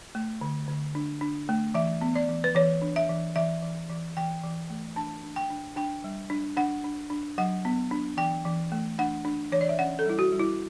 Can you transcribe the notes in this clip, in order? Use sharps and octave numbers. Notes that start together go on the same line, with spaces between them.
A3
D3
D3
D4
D4
A3
E3 E5
B3
D5
E3
B4
E3 C#5
D4
E5
E3
E3 E5
E3
E3
E3 G5
E3
A3
D4 A5
D4
G5
D4
D4 G5
G3
D4
D4 F#5
D4
D4
F#3 F#5
B3
D4
E3 G5
E3
A3
D4 F#5
D4
E3 C#5
D5
E5
C#4 F#5
A4
G3 E4
F#4
G3
E4